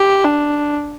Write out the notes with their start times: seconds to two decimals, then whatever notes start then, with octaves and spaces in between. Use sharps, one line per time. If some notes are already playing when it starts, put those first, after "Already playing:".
Already playing: G4
0.24 D4